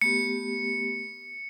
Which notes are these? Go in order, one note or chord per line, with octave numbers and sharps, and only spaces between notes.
A3 B3 G4 C#7